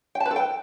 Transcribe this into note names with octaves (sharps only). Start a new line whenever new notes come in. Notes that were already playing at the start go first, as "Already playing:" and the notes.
G5
A5
B4
A4
G5